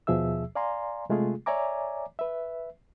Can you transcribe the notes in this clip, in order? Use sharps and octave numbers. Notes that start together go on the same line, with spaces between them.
D#2 B2 F3 G#4 E5 E6
D5 F5 G#5 A#5 C6
C3 G#3 A3 F4 G#4
C#5 D5 E5 G#5 A#5 D6
B4 E5